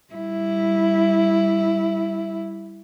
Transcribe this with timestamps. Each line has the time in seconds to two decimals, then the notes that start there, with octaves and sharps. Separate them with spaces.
0.13 G3 E4